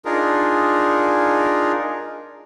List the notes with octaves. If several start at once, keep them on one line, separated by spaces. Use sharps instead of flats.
D4 D#4 F4 G#4 A#4